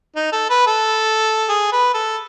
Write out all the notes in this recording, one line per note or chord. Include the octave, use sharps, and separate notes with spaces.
D#4
A4
B4
A4
G#4
B4
A4